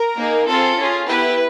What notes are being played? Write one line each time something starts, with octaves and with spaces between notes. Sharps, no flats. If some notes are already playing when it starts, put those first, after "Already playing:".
Already playing: A#4
A#3 D#4 G#4
C4 F4 G#4 A4
C#4 F4 G#4
B3 E4 G4 B4